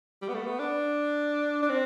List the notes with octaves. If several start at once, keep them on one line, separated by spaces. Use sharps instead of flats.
G3
B3
A3
B3
D4
D4
C4